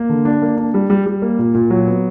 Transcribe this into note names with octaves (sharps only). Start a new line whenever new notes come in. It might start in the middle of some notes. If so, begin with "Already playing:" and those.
Already playing: A#3
D3
D4
A#3
D4
G3
G3
G3
A#3
A#2
A#2
F#3
B3